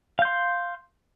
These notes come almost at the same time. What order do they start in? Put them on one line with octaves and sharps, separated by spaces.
F5 G6 C6